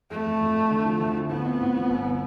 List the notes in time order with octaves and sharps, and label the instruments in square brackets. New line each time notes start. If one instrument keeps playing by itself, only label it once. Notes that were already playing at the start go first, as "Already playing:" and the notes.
[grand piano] F2 [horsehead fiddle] A3
[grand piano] F2
F2
F2
D3
F3
D2
F3
[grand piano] A2 [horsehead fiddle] B3
[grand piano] C4
A2
F3
G1